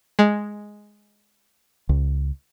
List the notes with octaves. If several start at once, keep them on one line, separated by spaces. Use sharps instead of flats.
G#3
C#2